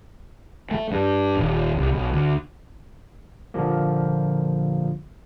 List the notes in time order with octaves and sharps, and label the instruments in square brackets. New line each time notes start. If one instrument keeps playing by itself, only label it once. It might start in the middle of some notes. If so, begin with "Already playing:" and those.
[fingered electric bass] A3
G2
D#1
C2
B1
D2
[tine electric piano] A#2 D3 F3 G3 A#3